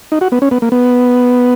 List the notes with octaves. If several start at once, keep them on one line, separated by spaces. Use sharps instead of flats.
D#4
F#4
B3
C#4
B3
A#3
B3